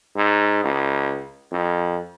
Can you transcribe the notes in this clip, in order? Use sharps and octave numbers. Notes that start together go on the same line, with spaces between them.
G#2
C#2
F2